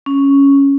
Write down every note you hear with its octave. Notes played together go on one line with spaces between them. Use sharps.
C#4